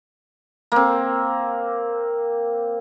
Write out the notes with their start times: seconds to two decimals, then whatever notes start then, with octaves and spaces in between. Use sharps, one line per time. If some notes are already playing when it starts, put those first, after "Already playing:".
0.72 A#3 C4